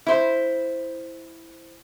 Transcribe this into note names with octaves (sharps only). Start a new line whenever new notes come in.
E4 C5